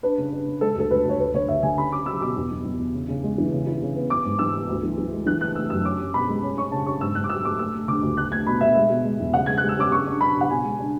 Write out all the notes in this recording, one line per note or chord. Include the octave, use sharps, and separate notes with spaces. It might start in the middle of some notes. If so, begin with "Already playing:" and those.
D4 B4
C#3
D4
C#3
G#3 A4
D2 A4
D2 B4
D2 C#5
D2 B4
D3 C#5
D2 E5
D3 G#5
C#4 B5
C#4 D6
F#3 E6
B2 D6
E2
E2
E2
E2
C#3
C#3
G#3
E3
C#3
E4
C#3
B3
B3 D6
G#2
E3 E6
B3
D2
E3
E3
G#3
E3 F#6
A3 F#6
A3 E6
F#2 E6
C#4 D6
C#4
B2 B5
G#3
C#4
C#4 C#6
C#3 A5
C#4 C#6
G#2 E6
G#2 F#6
D6
F#3 E6
A3 D6
A3 E6
A3
D3 D6
D2
A3 F#6
A3 G#6
B2 B5
B2 E5
G#3 E5
B2
G#3
E2
C#3 F#5
G#3 G#6
F#6
G#3
E6
C#4 D6
C#3 C#6
D4
D4 B5
C#3
F#5
B2 G#5
G#3
D4